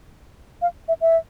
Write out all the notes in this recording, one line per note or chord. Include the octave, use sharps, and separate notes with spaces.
F5
E5
E5